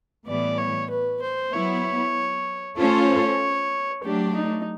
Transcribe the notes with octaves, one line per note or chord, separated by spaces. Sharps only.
A2 E3 G3 B3 D5
C#5
B4
C5
F#3 B3 E4 C#5
A3 C#4 F4 A4 C5 C#5
F#3 A3 D4 G4
D#4